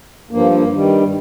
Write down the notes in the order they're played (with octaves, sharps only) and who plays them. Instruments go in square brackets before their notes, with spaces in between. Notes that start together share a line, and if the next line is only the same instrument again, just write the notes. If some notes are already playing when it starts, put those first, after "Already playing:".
[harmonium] G2 F3 A#3
A#3
G2 D#3 G3